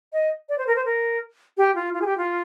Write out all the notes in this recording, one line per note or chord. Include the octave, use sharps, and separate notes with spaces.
D#5
D5
C5
A#4
C5
A#4
G4
F4
F4
G#4
G4
F4